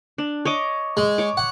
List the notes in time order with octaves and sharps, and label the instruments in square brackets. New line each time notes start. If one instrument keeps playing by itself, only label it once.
[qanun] D4
C#5 D#5 D6
[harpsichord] G#3
[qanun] C#5 D6
[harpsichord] F#5